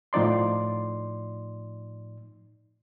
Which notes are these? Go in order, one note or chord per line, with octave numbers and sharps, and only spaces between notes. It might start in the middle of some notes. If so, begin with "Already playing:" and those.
A2 F3 D#4 D5 C6